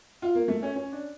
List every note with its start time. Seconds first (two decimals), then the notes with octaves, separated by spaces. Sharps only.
0.22 F4
0.35 A#3
0.48 A3
0.63 C#4
0.76 C#4
0.92 D4